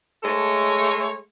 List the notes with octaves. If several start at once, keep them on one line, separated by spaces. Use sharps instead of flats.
G#3 A3 A4 C#5